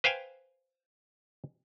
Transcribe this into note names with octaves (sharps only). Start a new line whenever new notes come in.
B4 C5 F5 G5 G#5